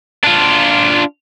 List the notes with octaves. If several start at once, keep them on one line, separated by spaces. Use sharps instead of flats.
D4 F4